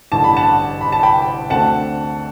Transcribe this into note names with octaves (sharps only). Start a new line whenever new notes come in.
A1 G2 D3 A5
B5
F#5 A5
B5
A5
G5 B5
D2 D3 A3 C4 F#5 A5